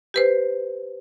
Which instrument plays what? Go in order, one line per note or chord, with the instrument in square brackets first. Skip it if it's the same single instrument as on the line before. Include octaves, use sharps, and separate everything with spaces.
[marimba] G4 B4 C5